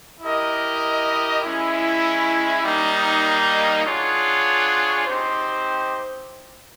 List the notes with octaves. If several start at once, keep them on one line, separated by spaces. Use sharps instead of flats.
E4 G4 A#4 D#5
G#3 C#4 E4
G3 A#3 D#4
D4 F4 G#4 C#5 F#5
C4 D#4 G4 C5